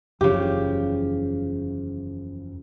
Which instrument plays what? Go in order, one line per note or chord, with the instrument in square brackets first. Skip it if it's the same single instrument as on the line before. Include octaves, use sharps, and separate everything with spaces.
[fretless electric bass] F#1 [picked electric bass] E2 F3 [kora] C#3 G4